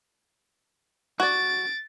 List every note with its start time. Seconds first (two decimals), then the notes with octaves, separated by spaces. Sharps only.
1.20 F#4 D5 A6 D7